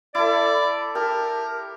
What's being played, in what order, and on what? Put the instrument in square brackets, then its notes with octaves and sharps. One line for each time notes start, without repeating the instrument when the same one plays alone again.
[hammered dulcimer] E4 A4 [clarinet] D5
[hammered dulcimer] G4 A5 [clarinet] A#4